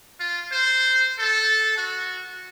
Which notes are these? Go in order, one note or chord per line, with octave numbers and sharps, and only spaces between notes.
F4
C5
A4
F#4